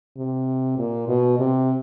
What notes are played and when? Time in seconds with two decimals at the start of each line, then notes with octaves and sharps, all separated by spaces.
0.17 C3
0.78 A#2
1.08 B2
1.39 C3